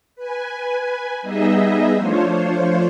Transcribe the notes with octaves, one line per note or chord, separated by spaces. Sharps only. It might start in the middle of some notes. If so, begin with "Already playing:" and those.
B4 G#5
G3 B3 D#4 G#4 D#5 E5
F3 A3 D4 F4 C5 C#5